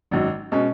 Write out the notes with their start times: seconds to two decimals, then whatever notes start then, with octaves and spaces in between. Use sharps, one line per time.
0.11 G#1 F#2 D#3 F#3
0.52 B2 G#3 C#4